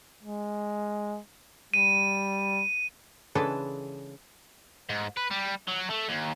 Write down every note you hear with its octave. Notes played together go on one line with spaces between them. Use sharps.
G#3
G3 D#7
C#3 E3 G#3 D4 A4 B4
G#2
B4
G3
F#3
A3
D#2